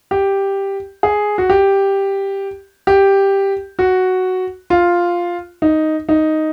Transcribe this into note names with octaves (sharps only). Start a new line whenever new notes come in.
G4
G#4
F#4
G4
G4
F#4
F4
D#4
D#4